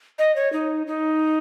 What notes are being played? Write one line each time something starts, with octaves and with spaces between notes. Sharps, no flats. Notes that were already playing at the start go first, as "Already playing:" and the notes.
D#5
C#5
D#4
D#4